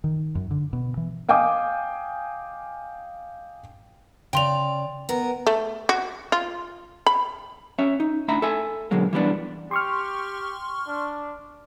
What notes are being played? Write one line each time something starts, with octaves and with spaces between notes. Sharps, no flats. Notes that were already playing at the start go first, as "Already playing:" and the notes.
D#3
F#2
D3
B2
E3
D#5 F5 G5 G#5 D6 D#6
C#3 D5 G5 C6 F7
B3 A#4
A3
F#4
F4
B5
C#4 C#5 E5
D#4
A2 D4 E5 A#5 B5
A4 E5 G#5
B2 D3 F#3 G#3 A#3
E3 G3 B3 D4
G4 C6 C#6 F6
D4